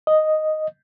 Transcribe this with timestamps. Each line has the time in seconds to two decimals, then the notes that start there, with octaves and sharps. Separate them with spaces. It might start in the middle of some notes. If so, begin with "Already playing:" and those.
0.07 D#5